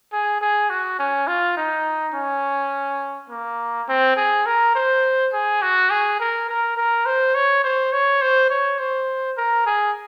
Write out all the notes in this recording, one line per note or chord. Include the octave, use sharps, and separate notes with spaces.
G#4
G#4
F#4
C#4
F4
D#4
C#4
A#3
C4
G#4
A#4
C5
G#4
F#4
G#4
A#4
A#4
A#4
C5
C#5
C5
C#5
C5
C#5
C5
A#4
G#4